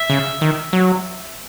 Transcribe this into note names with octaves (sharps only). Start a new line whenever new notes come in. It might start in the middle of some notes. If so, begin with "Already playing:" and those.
Already playing: E5
C#3
D#3
F#3